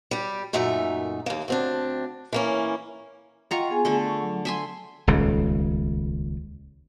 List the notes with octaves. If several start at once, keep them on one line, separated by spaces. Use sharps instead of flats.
G3 G4
F#2 A#2 A3 D#4 E5
D#2 A#3
D2 C4 D4
E3 A#3 C#4
F4 D#5 F#5 G5 A#5 C#6
B3 G#4 G#5
D3 A3 A4
C#6
F#3
E5 G#5 C6
D#1 C#2 C#3